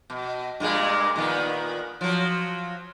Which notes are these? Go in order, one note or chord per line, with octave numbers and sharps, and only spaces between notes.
B2
G2 A#2 G#3
A#2 D#3 B3
F3 F#3